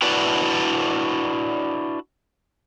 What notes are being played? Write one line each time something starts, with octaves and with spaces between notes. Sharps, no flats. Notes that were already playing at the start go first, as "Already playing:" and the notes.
D4 E4 F#4 B4 D5